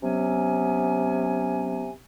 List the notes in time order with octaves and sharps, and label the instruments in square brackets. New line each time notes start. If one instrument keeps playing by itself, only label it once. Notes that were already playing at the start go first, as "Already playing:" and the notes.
[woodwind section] C3 F#3 B3 C#4 G#5